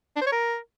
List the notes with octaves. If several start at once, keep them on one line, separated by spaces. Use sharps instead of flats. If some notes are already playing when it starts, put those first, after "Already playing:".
D4
C5
C#5
A#4